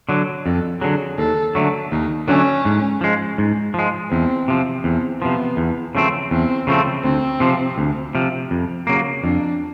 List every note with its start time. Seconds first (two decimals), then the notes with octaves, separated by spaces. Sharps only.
0.09 D3 F#3
0.46 F2 A4
0.81 D3 F#3 G#4
1.18 D#2 A4
1.55 D3 F#3 A3
1.91 D#2 D#4
2.28 D3 F#3 A3 C#4
2.65 G#2
3.01 F3 G#3
3.38 G#2
3.74 F3 G#3
4.11 E2 C4
4.48 C3 F3
4.84 E2 C4
5.21 C3 F3 B3
5.57 E2
5.95 C#3 F3 A3 C4
6.31 E2 C4
6.67 C#3 F3 A3 C4
7.04 D2 C4
7.40 C3 F3
7.78 D2
8.15 C3 F3
8.51 F2
8.87 C#3 F#3 A#3
9.24 F2 D4